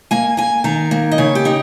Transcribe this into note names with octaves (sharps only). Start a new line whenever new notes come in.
A#3 G#5
A#3 G#5
D#3 A#5
A#3
D#5
C#3 C#5
G4
D#4